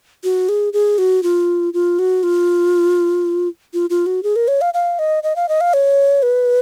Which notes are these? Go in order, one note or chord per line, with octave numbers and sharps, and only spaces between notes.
F#4
G#4
G#4
F#4
F4
F4
F#4
F4
F4
F4
F#4
G#4
A#4
C#5
F5
F5
D#5
D#5
F5
D#5
F5
C#5
B4